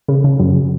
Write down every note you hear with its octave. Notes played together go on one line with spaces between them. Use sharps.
C#3
C#3
F#2